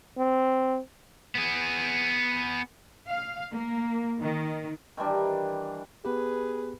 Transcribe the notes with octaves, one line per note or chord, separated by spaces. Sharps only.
C4
B3 G#4
F5
A#3
D#3
D#3 E3 G3 D4
B3 G4 G#4 B4